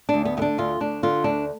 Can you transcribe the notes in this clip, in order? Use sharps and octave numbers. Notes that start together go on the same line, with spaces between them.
D4
D2
B3
D3 B3 D4
D2 F4
D2 D4
D3 F4
D2 D4